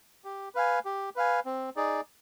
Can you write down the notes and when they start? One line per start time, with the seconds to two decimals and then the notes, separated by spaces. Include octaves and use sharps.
0.25 G4
0.55 B4 F5 G#5
0.85 G4
1.16 B4 F5 G#5
1.45 C4
1.76 D#4 G#4 D5